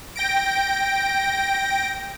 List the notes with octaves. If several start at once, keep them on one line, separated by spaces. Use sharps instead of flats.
G5 A#6 D7